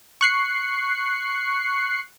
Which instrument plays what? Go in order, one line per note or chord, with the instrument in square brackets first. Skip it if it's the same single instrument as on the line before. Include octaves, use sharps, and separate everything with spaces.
[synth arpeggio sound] C#6 F#6 C7 C#7